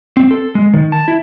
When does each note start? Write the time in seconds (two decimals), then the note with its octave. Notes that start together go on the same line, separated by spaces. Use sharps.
0.17 C4
0.31 A4
0.55 G#3
0.73 D#3
0.92 A5
1.08 E4